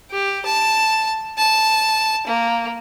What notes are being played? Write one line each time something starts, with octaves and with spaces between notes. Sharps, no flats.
G4
A5
A5
A#3